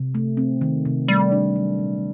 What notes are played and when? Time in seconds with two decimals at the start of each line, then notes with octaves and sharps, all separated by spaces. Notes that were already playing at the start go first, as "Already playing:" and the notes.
Already playing: C3
0.15 A3
0.37 C4
0.61 D#3
0.85 C3
1.08 G3 A3
1.32 D4
1.56 F#3
1.79 A#2